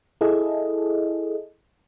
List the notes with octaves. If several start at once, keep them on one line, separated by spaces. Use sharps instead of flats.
E4 G#4 A4 D#5